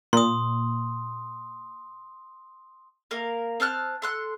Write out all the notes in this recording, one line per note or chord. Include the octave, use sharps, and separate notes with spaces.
A#2 C6 D#6
A#3 A#4 F5
C4 A5 F6 F#6
A4 C6 F#6